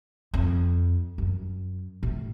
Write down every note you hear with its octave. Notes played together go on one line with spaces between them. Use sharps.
F2
F#2
A2